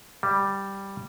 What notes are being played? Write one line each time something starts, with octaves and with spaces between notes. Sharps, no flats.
G3